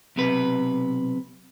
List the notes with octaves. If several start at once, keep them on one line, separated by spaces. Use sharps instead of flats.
B1 C3 B4